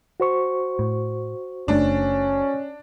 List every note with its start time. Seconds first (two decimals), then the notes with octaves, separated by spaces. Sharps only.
0.20 F#4 C5 C#6
0.79 A2
1.68 F#1 A3 C#4 D4